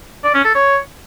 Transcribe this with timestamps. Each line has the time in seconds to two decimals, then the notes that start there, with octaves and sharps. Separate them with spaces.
0.24 D5
0.35 C#4
0.45 A4
0.55 C#5